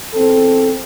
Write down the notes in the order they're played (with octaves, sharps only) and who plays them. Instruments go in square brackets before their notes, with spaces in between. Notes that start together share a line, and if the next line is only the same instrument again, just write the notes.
[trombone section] E2 C4 A4